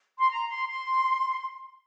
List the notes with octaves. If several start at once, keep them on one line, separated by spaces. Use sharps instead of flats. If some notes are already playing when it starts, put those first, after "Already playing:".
C6
A#5
C6
C6